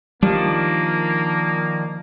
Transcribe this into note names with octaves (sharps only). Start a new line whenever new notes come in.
D#3 F3 G3 A#3 D4